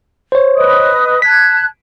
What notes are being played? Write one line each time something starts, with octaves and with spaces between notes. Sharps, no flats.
C5 C#5
B4 D#5 D#6
A5 F#6 G#6 B6